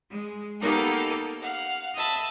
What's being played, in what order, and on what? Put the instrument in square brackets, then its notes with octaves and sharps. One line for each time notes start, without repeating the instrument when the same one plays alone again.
[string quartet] G#3
A#3 B3 D#4 G4 A4 A#4
F5 F#5
D#5 E5 A5 B5